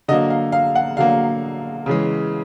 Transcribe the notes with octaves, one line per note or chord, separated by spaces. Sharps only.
D3 F#3 A#3 D#5
F5
F5
F#5
D3 F#3 A#3 F5
C#3 E3 G#3